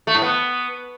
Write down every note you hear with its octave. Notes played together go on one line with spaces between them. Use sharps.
A3
A2
B3